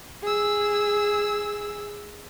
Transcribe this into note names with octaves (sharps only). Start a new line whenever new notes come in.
G#4 E6